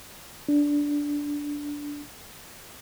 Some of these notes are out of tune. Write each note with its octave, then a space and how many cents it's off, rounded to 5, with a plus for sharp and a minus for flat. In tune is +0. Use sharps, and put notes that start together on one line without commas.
D4 -10